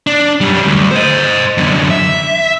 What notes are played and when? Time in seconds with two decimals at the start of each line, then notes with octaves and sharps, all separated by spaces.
0.07 D4
0.41 F#2 G3
0.66 D2
0.91 C5 D#5
1.58 F#2 D3
1.91 E5